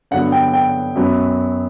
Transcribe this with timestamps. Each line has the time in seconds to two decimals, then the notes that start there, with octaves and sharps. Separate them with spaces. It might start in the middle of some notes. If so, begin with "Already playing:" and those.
0.11 G2 D3 F#3 B3 F#5
0.32 G5
0.54 G5
0.95 F#2 F#3 B3